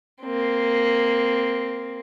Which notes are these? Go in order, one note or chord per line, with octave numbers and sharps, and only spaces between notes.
A#3 C4